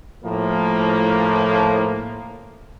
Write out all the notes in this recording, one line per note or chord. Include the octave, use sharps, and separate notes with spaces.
A2 F3 A#3